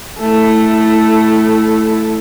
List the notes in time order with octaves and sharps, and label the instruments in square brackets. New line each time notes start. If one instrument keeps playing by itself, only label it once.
[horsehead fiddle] A3 E4